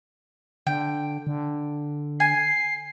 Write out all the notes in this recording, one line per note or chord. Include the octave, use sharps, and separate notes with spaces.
D3 G5
D3
G#5 C7